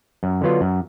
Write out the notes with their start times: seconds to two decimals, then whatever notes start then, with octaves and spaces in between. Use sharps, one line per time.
0.23 F#2
0.41 D3 F#3 B3 F4
0.61 F#2